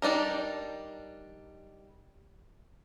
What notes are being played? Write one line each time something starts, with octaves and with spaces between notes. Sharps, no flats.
G3 D4 D#4 A#4